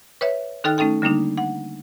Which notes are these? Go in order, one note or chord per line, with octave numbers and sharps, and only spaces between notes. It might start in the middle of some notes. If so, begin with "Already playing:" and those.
B4 C#5 E5
D#3 D#4 A4 G5 F6 F#6
A3 C#4 D#4 A4 G5
D3 G3 A#3 D4 D#4
F#5